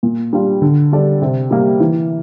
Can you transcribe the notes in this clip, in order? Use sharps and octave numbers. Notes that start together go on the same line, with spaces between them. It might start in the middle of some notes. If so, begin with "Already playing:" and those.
A#2
G3 D4 F4
D3
G3 D4 A4 D5
C3
G3 A#3
E3